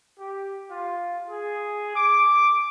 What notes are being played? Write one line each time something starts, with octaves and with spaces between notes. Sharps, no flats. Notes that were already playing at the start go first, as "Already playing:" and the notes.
G4
F4
G#4
D6